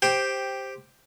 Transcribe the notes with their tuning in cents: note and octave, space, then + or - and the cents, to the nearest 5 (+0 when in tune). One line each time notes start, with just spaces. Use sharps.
G4 +5 C5 +0 G5 +0